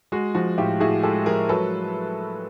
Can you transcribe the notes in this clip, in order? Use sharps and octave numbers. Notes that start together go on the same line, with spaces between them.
G#3 F#4
F3 F#4
A2 F4 G4
A2 F#4 G#4
G#3 G4 A4
F3 G#4 A#4
F#3 A4 B4